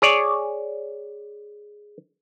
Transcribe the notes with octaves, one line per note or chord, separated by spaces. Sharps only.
G#4 C#5 D5